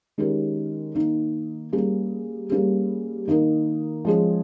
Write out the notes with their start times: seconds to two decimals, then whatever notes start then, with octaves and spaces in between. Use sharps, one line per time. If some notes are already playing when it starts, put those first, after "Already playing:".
0.18 D#3 G#3 C#4 G4 A#4
0.95 D#3 A#3 D#4
1.72 G3 A#3 C#4 G#4
2.50 G3 A#3 C#4 G#4
3.27 D#3 A#3 D#4 A#4
4.05 F3 G#3 C#4 G#4